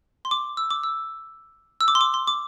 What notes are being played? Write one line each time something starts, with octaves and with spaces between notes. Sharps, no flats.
C6
D6
E6
D6
E6
E6
D6
C6
D6
C6
D6